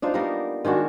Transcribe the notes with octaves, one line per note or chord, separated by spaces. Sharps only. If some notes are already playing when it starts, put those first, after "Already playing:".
D4 D#4 F4 C5
G3 A#3 B3 A#4
D#3 G#3 D4 F#4